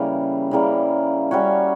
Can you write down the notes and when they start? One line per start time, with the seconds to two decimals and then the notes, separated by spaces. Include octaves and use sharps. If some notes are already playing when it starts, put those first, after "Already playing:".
Already playing: C#3 E3 G3 A#3
0.51 C#3 E3 G3 A#3
1.31 G3 C#4 F#4 C#5